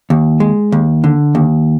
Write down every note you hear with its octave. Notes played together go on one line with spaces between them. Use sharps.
D#2
G#3
D#2
D3
D#2